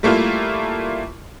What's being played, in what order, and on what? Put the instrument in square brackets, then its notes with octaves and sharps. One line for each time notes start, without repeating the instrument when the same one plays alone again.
[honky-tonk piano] G3 A3 A#3 E4 F4